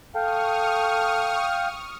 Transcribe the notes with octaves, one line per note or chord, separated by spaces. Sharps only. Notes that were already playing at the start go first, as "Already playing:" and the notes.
A4 F5 G5 C#6 D#6 F6